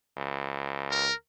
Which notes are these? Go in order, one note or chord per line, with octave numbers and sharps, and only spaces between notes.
C#2
A#4